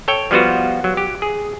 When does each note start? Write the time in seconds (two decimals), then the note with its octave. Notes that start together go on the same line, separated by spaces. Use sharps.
0.08 A4 C#5 G5
0.31 F3 G3 B3 F4 F#4
0.84 F#3
0.97 G4
1.22 G#4